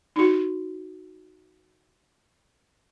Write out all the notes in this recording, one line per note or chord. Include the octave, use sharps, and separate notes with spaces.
D#4 F#4